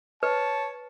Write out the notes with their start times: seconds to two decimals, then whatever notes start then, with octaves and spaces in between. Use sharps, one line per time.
0.23 B4 C#5 A5